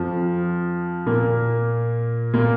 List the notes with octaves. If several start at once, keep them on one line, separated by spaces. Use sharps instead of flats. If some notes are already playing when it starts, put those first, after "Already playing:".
Already playing: F2 F3
A#2 A#3
A#2 A#3